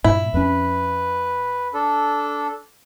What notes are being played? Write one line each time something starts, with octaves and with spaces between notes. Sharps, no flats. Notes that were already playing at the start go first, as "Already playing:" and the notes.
G2 A#2 E4
F2 C#4 B4
D4 A4